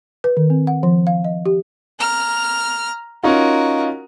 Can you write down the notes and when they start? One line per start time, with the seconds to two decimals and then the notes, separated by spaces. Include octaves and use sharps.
0.24 B4
0.37 D#3
0.50 C4
0.67 F#5
0.83 F3
1.07 F5
1.24 D#5
1.46 G4
1.99 A#5 F6
3.23 C#4 D#4 F4 F#4 A#4